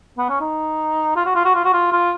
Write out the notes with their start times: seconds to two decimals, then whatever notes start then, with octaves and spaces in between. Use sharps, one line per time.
0.18 B3
0.29 C#4
0.40 D#4
1.16 F4
1.25 F#4
1.35 F4
1.45 F#4
1.55 F4
1.64 F#4
1.73 F4
1.92 F4